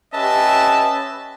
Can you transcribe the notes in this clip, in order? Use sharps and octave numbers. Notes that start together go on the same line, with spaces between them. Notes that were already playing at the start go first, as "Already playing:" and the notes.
C#4 G4 B4 D#5 E5 A5